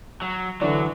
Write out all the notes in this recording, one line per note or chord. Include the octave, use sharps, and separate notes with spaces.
F#3
D3 E3 F#3 D4